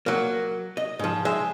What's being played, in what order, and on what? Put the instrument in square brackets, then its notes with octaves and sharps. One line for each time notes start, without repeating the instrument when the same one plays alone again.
[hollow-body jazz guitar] F#3 A#3
D#5
G#2 F3
G#3 E5